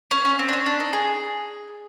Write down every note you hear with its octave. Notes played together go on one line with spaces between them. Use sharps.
C#4
C#4
C4
D4
C#4
D4
D#4
G#4